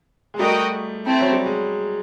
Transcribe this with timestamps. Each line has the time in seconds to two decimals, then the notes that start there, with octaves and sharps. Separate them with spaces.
0.34 G#3
0.39 G3 A3 F#4 A#4 D#5 G5
1.05 A3 C4 E4
1.21 F#3
1.33 G3
1.46 G#3